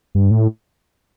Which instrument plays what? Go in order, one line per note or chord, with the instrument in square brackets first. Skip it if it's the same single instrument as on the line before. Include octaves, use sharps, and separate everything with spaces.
[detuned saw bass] G2
A2